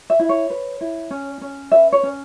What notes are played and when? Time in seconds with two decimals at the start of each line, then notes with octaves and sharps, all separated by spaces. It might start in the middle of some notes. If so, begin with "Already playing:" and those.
0.10 E5
0.19 E4
0.29 C#5
0.50 B4
0.81 E4
1.11 C#4
1.41 C#4
1.72 B4 E5
1.92 C#5
2.03 C#4